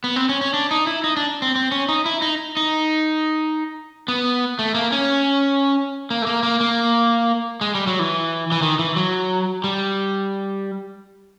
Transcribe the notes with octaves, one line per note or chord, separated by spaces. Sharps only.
B3
C4
C#4
C#4
D4
D#4
E4
D#4
D4
C4
C4
C#4
D#4
E4
D#4
D#4
B3
A3
A#3
C#4
A#3
A3
A#3
A#3
A#3
G#3
G3
F#3
E3
E3
D#3
E3
F#3
G3